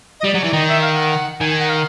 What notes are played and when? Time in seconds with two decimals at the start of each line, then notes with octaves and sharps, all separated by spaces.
0.20 D#5
0.24 G3 D5
0.34 F#3
0.41 E3 D5
0.53 D#3 D#5
0.68 E5
0.82 F5
0.93 F5
0.96 F#5
1.40 D#3 G#5
1.50 G#5
1.60 F#5
1.69 F5